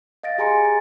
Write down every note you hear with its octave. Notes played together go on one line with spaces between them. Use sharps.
D#5 F5 A6 A#6 D7
G4 G#4 G#5 A#5 C6 C#7
A6